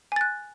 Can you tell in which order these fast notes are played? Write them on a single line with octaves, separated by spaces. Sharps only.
G#5 A6 F#6